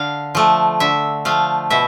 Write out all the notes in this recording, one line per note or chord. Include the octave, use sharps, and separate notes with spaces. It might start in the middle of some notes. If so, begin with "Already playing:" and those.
Already playing: D3 F5
F3 A3
D3 E5
F3 A3 F5
B2 E5